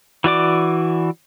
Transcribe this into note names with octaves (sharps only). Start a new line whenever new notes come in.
E3 F#4 D5 D6